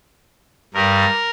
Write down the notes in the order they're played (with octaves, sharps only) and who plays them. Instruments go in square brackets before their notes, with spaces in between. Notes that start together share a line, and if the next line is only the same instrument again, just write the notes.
[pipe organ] G2 G3 A#4